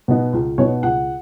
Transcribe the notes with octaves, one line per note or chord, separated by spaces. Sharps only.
B2 B3 D#4
C#2
B2 B3 D#4 C#5
C#2 F#5